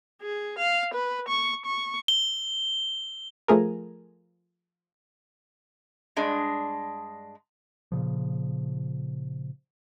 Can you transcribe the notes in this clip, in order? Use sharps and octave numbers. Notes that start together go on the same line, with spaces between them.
G#4
F5
B4
C#6
C#6
G7
F3 A3 G#4 A#4
G2 G#3 D4
A#2 C#3 F3